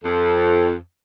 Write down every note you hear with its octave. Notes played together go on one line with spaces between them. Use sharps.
F2 A4